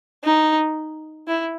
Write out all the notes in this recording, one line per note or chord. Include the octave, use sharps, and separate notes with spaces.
D#4
E4